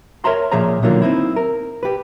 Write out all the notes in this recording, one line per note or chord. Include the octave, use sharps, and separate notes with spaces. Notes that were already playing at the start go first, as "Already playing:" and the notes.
A#4 C#5 D#5 E5 A#5 C6
A#2 F3 G#4 C#5 E5 A#5
B2 D3 D#3 F#3 A#3 F4
C4 D#4 E4
A#4
G4 B4